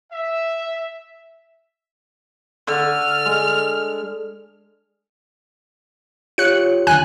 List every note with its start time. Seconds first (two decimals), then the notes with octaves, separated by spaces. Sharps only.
0.12 E5
2.67 D3 F6
3.26 G#3
6.38 F4 G4 C#5 F#6 C#7
6.87 D#2 D3 G#5 F#6